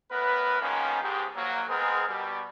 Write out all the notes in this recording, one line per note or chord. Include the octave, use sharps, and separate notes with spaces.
A2 B3 A#4 B4
G#2 D#3 F3 A#3 B3 C#4
C#2 G#2 G4
A#1 F#3 A#3
G#3 B3 C4 G#4 A#4
B2 G3